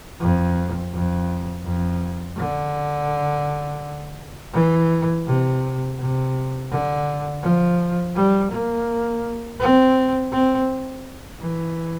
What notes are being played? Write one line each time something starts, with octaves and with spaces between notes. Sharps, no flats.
F2
F2
F2
D3
E3
C3
C3
D3
F3
G3
A#3
C4
C4
E3